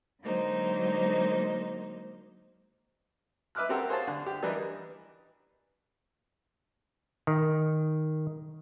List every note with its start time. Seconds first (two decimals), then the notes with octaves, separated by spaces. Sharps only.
0.22 D3 F#3 G#3 A#3 D#4 C5
3.55 B4 E5 D6 F6 F#6
3.69 C4 F#4 G4 A4 A#4 C5
3.89 G#4 C5 C#5 F5 A5
4.07 D3
4.26 G4
4.43 E3 G3 D4 A#4 B4 D#5
7.27 D#3